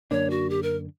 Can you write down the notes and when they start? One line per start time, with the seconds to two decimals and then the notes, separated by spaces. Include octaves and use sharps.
0.11 F#2 D3 A#3 D4 C#5
0.30 F#4
0.50 G4
0.63 A#4